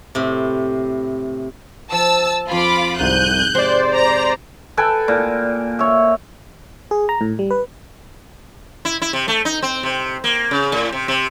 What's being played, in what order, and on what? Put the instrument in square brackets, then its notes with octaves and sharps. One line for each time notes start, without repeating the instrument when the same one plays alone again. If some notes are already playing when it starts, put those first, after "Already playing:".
[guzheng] A2 C3
[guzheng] F3 [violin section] A5 E6
[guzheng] F2 G#5 [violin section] F4 B5 D6
[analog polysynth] C2 D#7 [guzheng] G#2 [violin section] F#6 G6
[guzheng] C3 G#3 C4 [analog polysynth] C5 D5
[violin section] A#5
[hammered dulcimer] A4 B4 G5 G#5
A#2
C#5 E5
[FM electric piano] G#4
A#5
A2
G3
B4
[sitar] E4
E4
C3
A3
D#4
C4
C3
A#3
C#3
A2
C3
C3